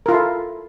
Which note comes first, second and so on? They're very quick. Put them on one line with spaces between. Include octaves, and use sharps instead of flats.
A#4 F4 E4 A4